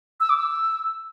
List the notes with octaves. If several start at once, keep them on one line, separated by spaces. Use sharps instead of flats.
E6
D6
E6